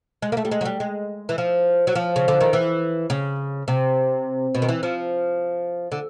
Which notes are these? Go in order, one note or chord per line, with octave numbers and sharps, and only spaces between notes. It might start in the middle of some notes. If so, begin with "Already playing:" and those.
G#3
A#3
A3
G3
G#3
F#3
G3
G#3
E3
F3
F#3
F3
C#3
D3
D#3
E3
C#3
C3
B2
D#3
E3
F3
D3